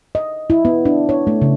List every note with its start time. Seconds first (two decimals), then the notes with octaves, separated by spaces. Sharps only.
0.15 D#5
0.50 E4
0.65 B3
0.85 D4
1.09 C#5
1.27 A3
1.42 C#3